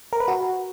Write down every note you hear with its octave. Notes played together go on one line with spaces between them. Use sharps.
A#4
B4
F#4